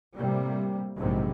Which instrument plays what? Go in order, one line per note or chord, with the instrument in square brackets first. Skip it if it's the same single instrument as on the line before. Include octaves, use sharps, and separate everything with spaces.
[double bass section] A2 C3 G3 A#3
A#1 G#2 C3 F#3